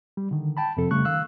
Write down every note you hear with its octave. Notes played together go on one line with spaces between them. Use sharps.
G3
D3 D#3
G5 A5 B5
F2 C3 F3 C4 A4
C#3 G3 A3 C#6 F#6
D#3 F5 E6 F#6